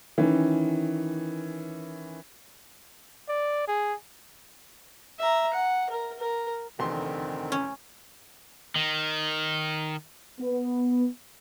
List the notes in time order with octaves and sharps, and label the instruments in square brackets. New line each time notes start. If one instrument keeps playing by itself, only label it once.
[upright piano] D#3 E3 C#4
[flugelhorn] D5
G#4
[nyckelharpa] E5 A#5
F#5
A#4
A#4
[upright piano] F1 E2 C6 [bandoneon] D3 D#3 C4
[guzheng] C#4
[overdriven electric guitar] D#3
[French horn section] B3